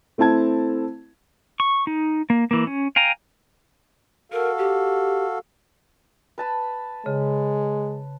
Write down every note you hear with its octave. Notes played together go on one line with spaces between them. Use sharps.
A3 C4 E4 A5 G#6
C#6
D#4
A#3
E3 A#3
C#4
F5 G5 G#5 A#5
F#4 A4 A#4 F5
G4
B4 A5 B5
C#3 G#3